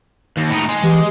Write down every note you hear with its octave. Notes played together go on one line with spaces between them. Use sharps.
D#2 A#6
A2 D#4
G#3
E3 G4